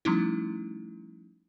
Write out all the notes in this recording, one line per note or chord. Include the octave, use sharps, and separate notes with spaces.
F3 G3 A3 C#4 D#4 E4